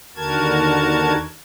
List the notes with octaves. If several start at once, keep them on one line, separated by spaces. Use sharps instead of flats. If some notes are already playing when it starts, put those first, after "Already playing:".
D#2 D3 F#4 A#4 A5 G#6